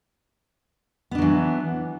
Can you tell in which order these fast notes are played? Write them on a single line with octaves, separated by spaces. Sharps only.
B3 D4 F#3 E3